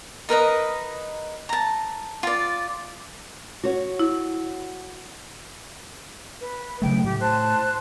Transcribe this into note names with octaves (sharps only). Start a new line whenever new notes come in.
D#4 A#4 B4 D#5
A5 A#5
F4 D5
F#4 C#5
E4
B4
C#3 F#3 A3 G5
A2 G4
C5 A5 F#6